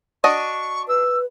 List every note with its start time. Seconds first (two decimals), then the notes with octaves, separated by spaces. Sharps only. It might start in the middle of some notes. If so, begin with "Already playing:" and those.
0.24 D4 F#4 D#5 C#6
0.88 B4 E6